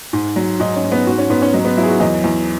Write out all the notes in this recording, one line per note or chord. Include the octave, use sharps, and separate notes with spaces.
G#2
F#3
G#2 D#4
C#4
G#2
B3
G#2 F#4
C#4
G#2 B3
C#4
F#3 D#4
B3
F#3 E4
G#4
F#4
E2 D#5
E2